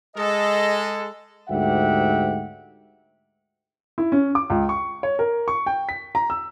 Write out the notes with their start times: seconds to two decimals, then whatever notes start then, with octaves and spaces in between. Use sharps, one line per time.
0.16 G#3 A4 D#5
1.49 D2 G#2 G4 E5 F#5 G5
3.98 E4
4.12 C#4
4.35 D6
4.50 C#2
4.69 C#6
5.03 C#5
5.19 A#4
5.48 C#6
5.66 G5
5.89 B6
6.15 A#5
6.30 E6